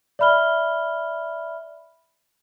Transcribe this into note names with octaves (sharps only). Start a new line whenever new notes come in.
D5 E5 B5 F6 G7